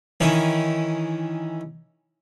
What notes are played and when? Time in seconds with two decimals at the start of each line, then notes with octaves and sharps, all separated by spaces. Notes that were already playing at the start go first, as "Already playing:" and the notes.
0.20 D#3 E3 C#4 D#4 E4